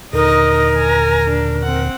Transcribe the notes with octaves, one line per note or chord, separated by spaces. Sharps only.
D#2 A#2 D3 D#4 A#4 D#5
G#5 A#5
D4
C4 F#5